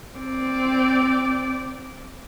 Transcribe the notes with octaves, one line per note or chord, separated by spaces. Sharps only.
C4 D5